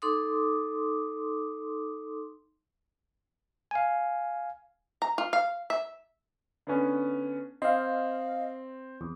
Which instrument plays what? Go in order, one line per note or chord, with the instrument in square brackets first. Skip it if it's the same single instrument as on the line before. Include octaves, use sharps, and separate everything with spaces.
[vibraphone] D#4 A4 C6 D6 D#6
[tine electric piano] F5 G#5
[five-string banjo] A#5
F4
F5
E5
[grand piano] D3 B3 C#4
[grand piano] C4 [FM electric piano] D#5 F5
[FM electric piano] E2